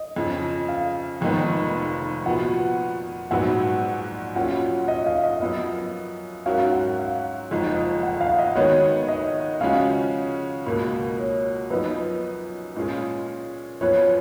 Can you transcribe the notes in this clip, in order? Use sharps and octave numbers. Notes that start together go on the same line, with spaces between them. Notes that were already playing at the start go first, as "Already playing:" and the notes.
Already playing: D#5
F2 C#3 F3
F5
F1 F2 D#3 G#3 B3
A#2 F3 B3 F#4 F#5
A#1 G#2 F#3 B3 F#4 F#5
A#2 F#3 C#4 F4 F#5
D#5
F5
D#5
F#2 F3 B3 D#5
G#2 F#3 C#4 F#4 A#4 F5
F#5
F5
F#1 F2 F3 G#3 D#4
F#5
F5
D#5
D#3 G#3 B3 F#4 C#5
D#5
C#3 F3 G#3 C#4 F#4 F5
C#2 B2 A#3
C#5
F#2 F3 B3 D#4 B4
A#2 G#3 C#4 F4 G#4
F#2 F3 B3 F4 B4 C#5